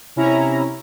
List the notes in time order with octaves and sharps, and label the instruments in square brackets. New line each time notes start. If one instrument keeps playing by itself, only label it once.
[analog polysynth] C3 C#4 E4 A#5